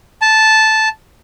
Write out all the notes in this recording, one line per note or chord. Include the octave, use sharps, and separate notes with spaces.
A5